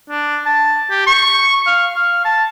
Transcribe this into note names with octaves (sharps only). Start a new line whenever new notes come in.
D4
A5
G4
C#6
F5
F5
A5